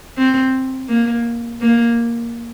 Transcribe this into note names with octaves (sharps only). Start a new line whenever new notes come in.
C4
A#3
A#3